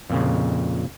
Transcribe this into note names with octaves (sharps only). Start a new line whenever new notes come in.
F2 A#2 C#3